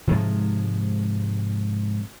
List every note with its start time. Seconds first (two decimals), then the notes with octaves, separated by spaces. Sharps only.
0.07 G#2 C3 F3 G#3